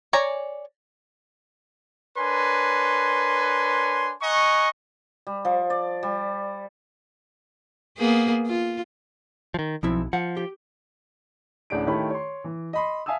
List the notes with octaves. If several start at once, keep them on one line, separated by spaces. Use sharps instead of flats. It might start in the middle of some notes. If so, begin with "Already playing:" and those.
C#5 D5 G#5 A#5
D4 A#4 B4 C#5 G#5 C6
D#5 F#5 G#5 A#5 C#6
G3
F3
D5
G3
A#3 B3 G#4
F4
D#3 F3
B1 F3 C4 E4
F3 F#5
G4
A1 D2 D4 G#4 D7
D#3 A3 E4 G4 C#5 B5
C#5 C6
E3
D#5 B5 C6
E5 F5 G#5 A5 D#6 E6